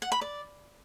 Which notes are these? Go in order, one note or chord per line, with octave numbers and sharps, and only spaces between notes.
F#5
B5
D5